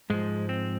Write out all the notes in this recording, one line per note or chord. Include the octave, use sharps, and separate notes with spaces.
G#2 F3 G#3
C4